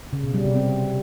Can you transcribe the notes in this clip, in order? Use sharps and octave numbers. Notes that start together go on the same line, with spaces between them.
C#3
B2
G3
C3
C4